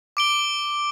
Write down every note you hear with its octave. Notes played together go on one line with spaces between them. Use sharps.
D6 D7 G7